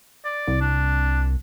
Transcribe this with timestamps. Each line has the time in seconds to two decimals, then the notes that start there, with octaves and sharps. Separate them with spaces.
0.25 D5
0.48 C2
0.61 D4